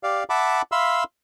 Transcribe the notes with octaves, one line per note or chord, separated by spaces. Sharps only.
G4 D5 F5
E5 F#5 A5 B5 D6
E5 F5 B5 C6 E6